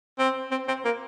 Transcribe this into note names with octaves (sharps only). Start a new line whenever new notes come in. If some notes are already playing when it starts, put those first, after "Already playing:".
C4
C4
C4
A#3